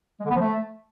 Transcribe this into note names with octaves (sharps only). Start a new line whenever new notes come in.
G#3
D3
B3
F3
A3